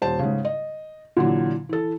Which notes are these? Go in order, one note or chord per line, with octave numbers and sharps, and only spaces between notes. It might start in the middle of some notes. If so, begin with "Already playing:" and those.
D#1 C5 A5
G#2 C#3
D#5
A#2 D3 E3 F#3
E3 A4